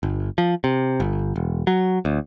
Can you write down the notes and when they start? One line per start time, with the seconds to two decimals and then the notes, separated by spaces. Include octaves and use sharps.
0.03 G1
0.38 F3
0.64 C3
1.00 G1
1.36 E1
1.67 F#3
2.05 D2